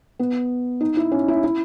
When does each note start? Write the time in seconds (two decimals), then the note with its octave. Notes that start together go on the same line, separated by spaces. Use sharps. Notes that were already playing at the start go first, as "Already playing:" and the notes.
0.19 B3
0.81 D#4
0.97 E4
1.12 C#4
1.28 E4
1.44 E4